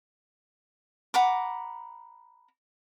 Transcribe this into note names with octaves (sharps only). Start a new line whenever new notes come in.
F#5 A#5 B5 D6